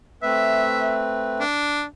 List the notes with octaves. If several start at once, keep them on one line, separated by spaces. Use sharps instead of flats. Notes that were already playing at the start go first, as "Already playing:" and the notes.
A3 C4 B4 E5
D4